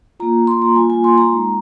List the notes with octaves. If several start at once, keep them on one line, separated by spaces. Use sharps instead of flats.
A#3 F4 A#5
C6
A#5
G3 A#3 F4 G#5
G#5
C6
A#5
G#3 D#4